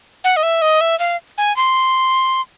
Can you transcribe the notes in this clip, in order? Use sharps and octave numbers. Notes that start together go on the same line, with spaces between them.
F#5
D#5
E5
D#5
E5
F5
G#5
C6